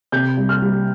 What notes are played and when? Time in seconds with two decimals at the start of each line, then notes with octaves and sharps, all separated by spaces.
0.12 C3 G6
0.37 G3
0.49 F6
0.62 G3